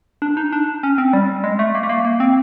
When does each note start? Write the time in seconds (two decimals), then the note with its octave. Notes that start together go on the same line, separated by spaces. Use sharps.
0.22 D4
0.37 D#4
0.52 D4
0.83 C#4
0.98 C4
1.13 G3
1.44 G#3
1.59 A3
1.75 A#3
1.83 A3
1.89 A#3
2.05 A#3
2.20 C4